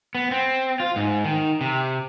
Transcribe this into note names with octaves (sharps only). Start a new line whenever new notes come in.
B3
C4
F4
G#2
D#3
C3